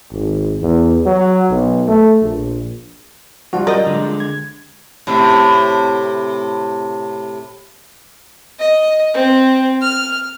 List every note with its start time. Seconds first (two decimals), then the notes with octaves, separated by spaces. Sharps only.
0.12 G#1
0.61 E2
1.06 F#3
1.50 B1
1.87 A3
2.22 A#1
3.53 F3 G3 F#4 F#5
3.67 F#3 A#4 D5 D#5 A#5 G6
3.86 D3 G#3
4.20 G#6
5.07 A2 C3
8.59 D#5
9.14 C4
9.82 F6